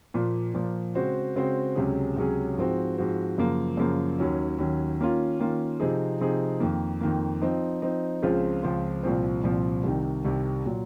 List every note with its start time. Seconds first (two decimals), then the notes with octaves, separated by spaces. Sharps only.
0.14 A#2 F3 A#3
0.54 A#2 F3 A#3
0.95 C#3 G#3 C4 F#4 C5
1.36 C#3 G#3 C4 F#4 C5
1.75 C#2 C3 F#3 C#4 G#4
2.16 C#2 C3 F#3 C#4 G#4
2.57 G#2 F3 C4 F#4
2.98 G#2 F3 C4 F#4
3.38 F#2 C#3 F3 A#3
3.77 F#2 C#3 F3 A#3
4.19 D#2 D#3 F#3 C#4
4.58 D#2 D#3 F#3 C#4
4.99 D#3 A#3 C#4 F4
5.39 D#3 A#3 C#4 F4
5.80 C3 F3 C4 D#4 G#4
6.20 C3 F3 C4 D#4 G#4
6.60 F2 D#3 A#3
7.01 F2 D#3 A#3
7.42 F3 C4 D#4
7.82 F3 C4 D#4
8.23 C#2 C#3 F3 C4 F4
8.63 C#2 C#3 F3 C4 F4
9.03 C2 A#2 F3 C4
9.44 C2 A#2 F3 C4
9.84 C2 C3 D#3
10.25 C2 C3 D#3
10.66 A#2 F#3